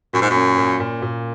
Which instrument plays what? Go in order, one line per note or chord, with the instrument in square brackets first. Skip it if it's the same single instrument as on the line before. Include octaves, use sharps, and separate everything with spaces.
[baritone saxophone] F#2 [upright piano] A#2
[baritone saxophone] G#2
F#2
[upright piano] C#4
A#2
A#2
A#2